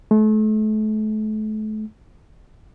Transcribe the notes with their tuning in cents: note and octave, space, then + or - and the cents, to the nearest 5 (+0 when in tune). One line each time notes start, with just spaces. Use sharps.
A3 -35